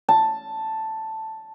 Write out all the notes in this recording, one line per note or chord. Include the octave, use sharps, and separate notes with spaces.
A5